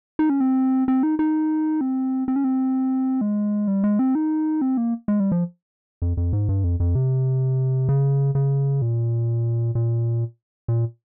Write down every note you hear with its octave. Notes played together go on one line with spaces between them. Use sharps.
D#4
C#4
C4
C4
D#4
D#4
C4
C4
C#4
C4
G#3
G3
G#3
C4
D#4
C4
A#3
G#3
G3
F3
F2
F2
G#2
G2
F2
F2
C3
C#3
C#3
A#2
A#2
A#2